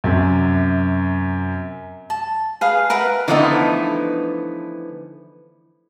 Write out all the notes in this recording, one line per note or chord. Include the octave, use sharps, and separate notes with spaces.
F#2 C3
A5
G#4 B4 F5
A#4 B4 E5 F#5
D3 E3 F3 A3 B3 D#4